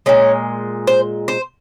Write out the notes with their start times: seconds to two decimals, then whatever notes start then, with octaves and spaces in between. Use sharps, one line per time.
0.06 A#2 G#3 C#4
0.87 C5
1.28 C5